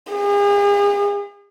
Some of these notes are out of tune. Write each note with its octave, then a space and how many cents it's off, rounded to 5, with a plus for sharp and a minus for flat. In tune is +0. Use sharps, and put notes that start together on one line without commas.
G#4 -40